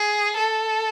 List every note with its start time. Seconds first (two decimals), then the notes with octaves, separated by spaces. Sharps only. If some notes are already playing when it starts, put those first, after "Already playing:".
Already playing: G#4
0.37 A4